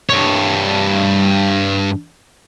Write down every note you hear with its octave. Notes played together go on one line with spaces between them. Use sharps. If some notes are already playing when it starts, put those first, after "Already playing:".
G2 C#5